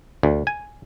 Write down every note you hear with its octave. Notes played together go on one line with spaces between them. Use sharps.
D2
G#5